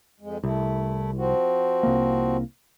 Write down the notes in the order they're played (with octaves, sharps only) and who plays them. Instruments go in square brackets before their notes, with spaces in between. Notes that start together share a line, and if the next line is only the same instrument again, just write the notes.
[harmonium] F2 G#3
[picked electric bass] C2 [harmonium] A3 E4
[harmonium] F3 C4 F#4
[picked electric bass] C2 A#3